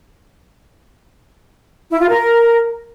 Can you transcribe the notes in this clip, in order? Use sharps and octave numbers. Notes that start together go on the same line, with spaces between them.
E4
F4
A#4